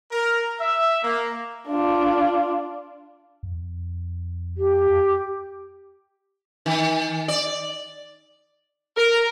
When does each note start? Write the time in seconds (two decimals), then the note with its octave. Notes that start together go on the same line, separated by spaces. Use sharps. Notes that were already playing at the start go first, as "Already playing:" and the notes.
0.12 A#4
0.60 E5
1.03 A#3
1.68 D4 F4
3.43 F2
4.57 G4
6.66 D#3
7.28 D5
8.97 A#4